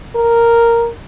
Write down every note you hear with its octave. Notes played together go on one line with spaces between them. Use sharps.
A#4